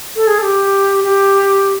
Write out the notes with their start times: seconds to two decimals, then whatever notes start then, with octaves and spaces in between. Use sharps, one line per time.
0.16 A4
0.27 G#4
0.38 A4
0.42 G4
1.04 G4